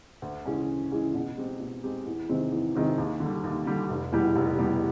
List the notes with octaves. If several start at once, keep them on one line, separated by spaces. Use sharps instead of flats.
D2
C#3 E3 G#3 C#4
D2
C#3 E3 G#3 C#4
B2
G#3 C4 D#4 G4
B2
G#3 C4 D#4 G4
E2
C3 D#3 G#3 C4
E2
C3 D#3 G#3 C4
D#2
D3
G3
D#2
D3 G3
F1
E2 B2 G3
F1
E2 B2 G3